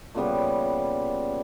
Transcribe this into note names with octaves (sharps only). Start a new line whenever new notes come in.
A#2 C#3 G3 B3